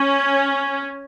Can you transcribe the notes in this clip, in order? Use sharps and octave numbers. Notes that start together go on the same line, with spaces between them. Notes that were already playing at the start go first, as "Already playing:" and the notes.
Already playing: C#4